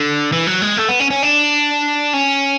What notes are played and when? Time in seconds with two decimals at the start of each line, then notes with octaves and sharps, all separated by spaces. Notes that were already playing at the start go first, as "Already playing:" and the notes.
Already playing: D3
0.32 E3
0.47 F#3
0.62 G#3
0.77 A3
0.89 B3
1.00 C#4
1.11 C#4
1.23 D4
2.13 C#4